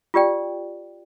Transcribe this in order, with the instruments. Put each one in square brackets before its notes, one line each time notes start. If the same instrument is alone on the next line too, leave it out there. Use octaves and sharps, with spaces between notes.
[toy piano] F4 G4 D5 G5